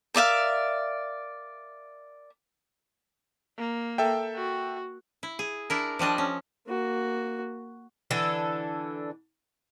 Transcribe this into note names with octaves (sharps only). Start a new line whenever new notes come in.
A#4 D5 E5 F5
A#3
A4 E5 G5
F#4
E4
G#4
D4 E4 A#4
F3 G3 D4 D#5
C#4
A#3 F#4
D3 E3 D4 A4